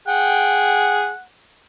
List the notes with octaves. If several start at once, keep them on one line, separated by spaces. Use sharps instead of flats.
G#4 F#5 G5